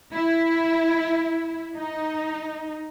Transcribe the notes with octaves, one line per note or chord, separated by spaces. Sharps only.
E4
D#4